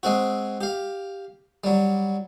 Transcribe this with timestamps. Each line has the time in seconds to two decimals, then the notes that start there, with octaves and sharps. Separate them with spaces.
0.03 G#3 C4 F#4
0.61 G4 F5
1.64 F#3 G3